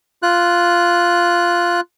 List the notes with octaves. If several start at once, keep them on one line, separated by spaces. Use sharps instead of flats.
F4 F#6